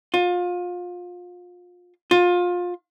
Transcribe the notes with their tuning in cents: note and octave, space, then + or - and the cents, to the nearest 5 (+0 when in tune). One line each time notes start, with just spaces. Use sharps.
F4 +30
F4 +25